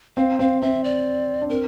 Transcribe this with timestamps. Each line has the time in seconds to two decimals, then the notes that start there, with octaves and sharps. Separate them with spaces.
0.17 C4 F5
0.39 C4 F5
0.62 C4 E5
0.84 D5
1.41 D4
1.50 C4 A#4